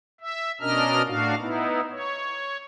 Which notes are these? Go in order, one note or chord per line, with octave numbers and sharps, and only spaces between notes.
E5
B2 C#4 D4 A#4 D#5 F6
A2 D4 F#4 F5
B3 D#4 E4
C#5